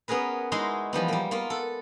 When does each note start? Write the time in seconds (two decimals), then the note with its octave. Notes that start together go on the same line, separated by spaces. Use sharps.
0.08 B3 C#4 G#4 A#4 B4
0.52 G#3 D#4 E4 F#4 D#5 C6
0.93 E3 F3 G3 B3
1.08 G3 A#3
1.31 A#3 B3 F4
1.50 A4 F#5